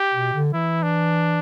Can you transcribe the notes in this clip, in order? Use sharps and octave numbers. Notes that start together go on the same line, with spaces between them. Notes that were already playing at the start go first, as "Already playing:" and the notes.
Already playing: G4
B2
D3
E3 E4
D4